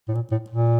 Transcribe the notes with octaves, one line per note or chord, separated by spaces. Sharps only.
A2
A#2
A2
A#2